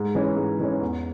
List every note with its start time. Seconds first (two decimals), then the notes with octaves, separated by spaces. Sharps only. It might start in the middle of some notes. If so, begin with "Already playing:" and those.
Already playing: G#2
0.15 E3 C#4
0.37 G#2
0.60 E3 C#4
0.81 E2